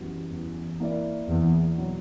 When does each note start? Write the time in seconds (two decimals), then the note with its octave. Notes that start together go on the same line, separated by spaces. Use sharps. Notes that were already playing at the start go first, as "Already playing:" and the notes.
Already playing: F#2 E3 G3 B3 F#4
0.31 E2
0.80 A#3 E4 A#4 D5
1.29 E2
1.77 B2 F#3